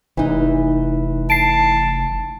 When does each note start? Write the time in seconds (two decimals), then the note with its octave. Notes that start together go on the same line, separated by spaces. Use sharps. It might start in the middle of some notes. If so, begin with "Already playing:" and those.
0.17 F1 E3 D#4
1.30 A5 C7 D7